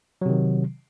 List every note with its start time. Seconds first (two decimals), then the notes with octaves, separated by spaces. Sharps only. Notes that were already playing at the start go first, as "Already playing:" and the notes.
0.21 F#3
0.26 C3
0.30 D#3